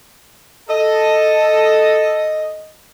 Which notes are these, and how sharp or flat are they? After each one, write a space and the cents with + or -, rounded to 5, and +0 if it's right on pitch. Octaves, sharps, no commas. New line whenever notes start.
A4 +0 D#5 +0